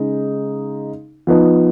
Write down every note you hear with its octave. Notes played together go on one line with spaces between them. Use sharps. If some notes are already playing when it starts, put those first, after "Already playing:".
Already playing: C#3 G#3 D#4
F3 B3 D#4